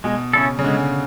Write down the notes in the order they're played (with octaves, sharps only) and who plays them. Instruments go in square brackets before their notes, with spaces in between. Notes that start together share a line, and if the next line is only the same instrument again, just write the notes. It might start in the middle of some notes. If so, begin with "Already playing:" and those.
[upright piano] B2 [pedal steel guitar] G#3
[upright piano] C#3 [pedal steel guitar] C#4 E4 A4
[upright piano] C#3
[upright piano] D3 [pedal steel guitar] G#3